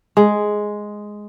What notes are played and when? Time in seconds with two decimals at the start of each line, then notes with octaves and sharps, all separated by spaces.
0.17 G#3